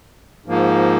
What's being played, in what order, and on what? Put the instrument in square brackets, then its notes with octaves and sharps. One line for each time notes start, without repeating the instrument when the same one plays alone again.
[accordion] G#2 F3 A#3